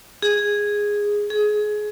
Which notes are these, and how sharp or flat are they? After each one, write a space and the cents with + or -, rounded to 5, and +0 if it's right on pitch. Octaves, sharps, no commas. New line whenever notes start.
G#4 -5
G#4 +20